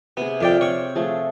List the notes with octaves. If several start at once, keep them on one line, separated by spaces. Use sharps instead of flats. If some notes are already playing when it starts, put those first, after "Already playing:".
C3 B3 G#4
F2 D5 F5 G5
C4 C#5 C#6
F3 A3 G#4